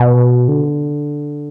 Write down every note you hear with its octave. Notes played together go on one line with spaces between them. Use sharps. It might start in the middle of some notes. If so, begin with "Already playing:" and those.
Already playing: B2
D3